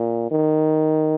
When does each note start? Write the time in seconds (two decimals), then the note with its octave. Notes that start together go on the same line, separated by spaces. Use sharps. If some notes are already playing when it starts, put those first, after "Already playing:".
Already playing: A#2
0.31 D#3